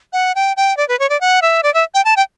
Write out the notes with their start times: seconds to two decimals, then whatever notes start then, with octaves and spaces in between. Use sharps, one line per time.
0.13 F#5
0.35 G5
0.57 G5
0.77 D5
0.88 B4
0.99 C#5
1.09 D5
1.21 F#5
1.42 E5
1.63 D5
1.74 E5
1.94 G5
2.05 A5
2.16 G5